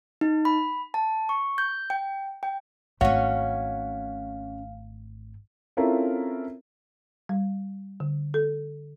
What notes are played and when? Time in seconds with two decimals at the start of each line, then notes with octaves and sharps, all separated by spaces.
0.21 D#4
0.45 B5
0.94 A5
1.29 C#6
1.58 G6
1.90 G5
2.43 G5
3.01 G#1 A3 C#4 F#4 C#5 F5
5.77 C4 C#4 E4 F4 A4 A#4
7.29 G3
8.00 D3
8.34 A4